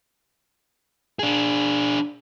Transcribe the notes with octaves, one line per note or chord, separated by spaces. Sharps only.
D4 G#4